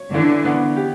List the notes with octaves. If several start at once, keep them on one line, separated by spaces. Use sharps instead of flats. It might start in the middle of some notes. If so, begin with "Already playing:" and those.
Already playing: C#5
D3 E3
B3
G4